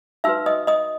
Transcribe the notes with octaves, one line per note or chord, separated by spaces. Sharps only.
D#4 F#4 B4 E5 E6
D#5 D#6
D#5 D#6